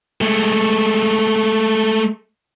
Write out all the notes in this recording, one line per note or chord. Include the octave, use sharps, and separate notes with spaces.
G#3 A3